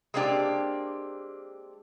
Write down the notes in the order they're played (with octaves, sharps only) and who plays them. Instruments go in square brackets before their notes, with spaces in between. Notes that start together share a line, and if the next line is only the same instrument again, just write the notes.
[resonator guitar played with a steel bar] G#3 A#3 C4 D4 G4